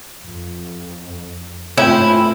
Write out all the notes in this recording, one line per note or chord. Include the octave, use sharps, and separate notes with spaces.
F2
G#2 A3 C4 C#4 E4 F4 B4 G5